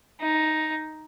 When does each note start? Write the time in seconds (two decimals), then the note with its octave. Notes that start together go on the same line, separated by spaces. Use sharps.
0.21 D#4